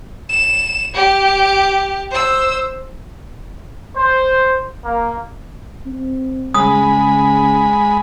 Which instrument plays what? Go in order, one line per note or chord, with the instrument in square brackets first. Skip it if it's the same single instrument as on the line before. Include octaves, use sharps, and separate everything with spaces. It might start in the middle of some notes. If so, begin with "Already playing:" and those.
[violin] E7
G4
C5 E6
[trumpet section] C5
A#3
[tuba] C4
[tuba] C#3 [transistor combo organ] G#3 B5 [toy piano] D#6